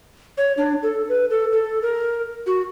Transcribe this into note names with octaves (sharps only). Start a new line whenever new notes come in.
C#5
D4
A4
B4
A4
A4
A#4
F#4